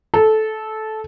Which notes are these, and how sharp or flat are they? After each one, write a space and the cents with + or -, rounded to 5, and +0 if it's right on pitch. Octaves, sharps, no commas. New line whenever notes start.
A4 -15